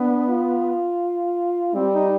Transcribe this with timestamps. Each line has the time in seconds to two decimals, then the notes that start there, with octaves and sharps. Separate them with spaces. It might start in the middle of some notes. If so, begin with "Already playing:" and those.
Already playing: B3 D4
0.28 F4
1.75 G3 C4
1.94 D#4